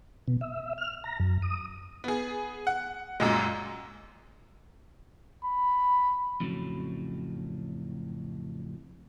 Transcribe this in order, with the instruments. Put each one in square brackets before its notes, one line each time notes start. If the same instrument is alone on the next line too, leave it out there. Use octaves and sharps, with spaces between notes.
[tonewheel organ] B2
E5
F6
A#5
F#2
D#6
[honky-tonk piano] B3 G#4
F#5
F#2 A#2 G#3
[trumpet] B5
[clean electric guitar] F2 A2 C#3 E3 F#3